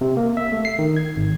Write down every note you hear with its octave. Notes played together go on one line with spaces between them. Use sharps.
C3
A#3
E5
A3
C7
D#3
G#6
G#1